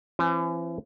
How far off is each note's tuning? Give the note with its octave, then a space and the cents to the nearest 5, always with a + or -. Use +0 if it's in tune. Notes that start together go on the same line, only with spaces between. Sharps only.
E3 +35 C4 +25 G#5 +15